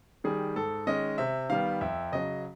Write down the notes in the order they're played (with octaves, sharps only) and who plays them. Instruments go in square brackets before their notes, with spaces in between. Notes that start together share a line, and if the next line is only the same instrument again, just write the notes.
[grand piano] D#3 G3 G#4
G#2 A4
D#3 G#3 C#4 D#5
C3 E5
D#3 G3 B3 F5
F2 E5
C#3 F#3 D#5